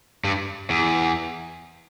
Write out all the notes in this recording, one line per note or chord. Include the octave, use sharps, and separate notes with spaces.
G2
E2